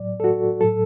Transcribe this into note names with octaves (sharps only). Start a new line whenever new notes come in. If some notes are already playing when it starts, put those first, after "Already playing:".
Already playing: A2 F#3 D5
A4
F#4
A2 F#3 A4